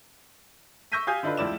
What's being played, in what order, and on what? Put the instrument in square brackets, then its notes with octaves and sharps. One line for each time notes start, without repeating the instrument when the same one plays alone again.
[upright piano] C#6 E6 G6 A#6 B6 D#7
G4 F5 G#5 D#6 G6
D3 D4 D#4 F4 B4
F1 C#2 F3 E4 D5 E7